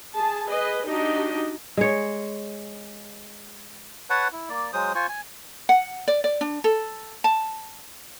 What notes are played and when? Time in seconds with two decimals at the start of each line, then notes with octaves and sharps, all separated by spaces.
0.15 G#4 A5
0.46 G#4 B4 D#5
0.86 D4 D#4 F#4 G4 D#5
1.77 G#3 C#5
4.10 B4 C#5 F#5 A5
4.33 E4
4.49 A#3 D5
4.73 F#3 G#3 C5 D#6
4.95 F4 C5 G#5 C#6
5.09 G#5
5.69 F#5
6.08 D5
6.24 D5
6.41 D4
6.64 A4
7.24 A5